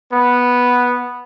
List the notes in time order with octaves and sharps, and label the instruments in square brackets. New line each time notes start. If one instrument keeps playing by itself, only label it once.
[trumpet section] B3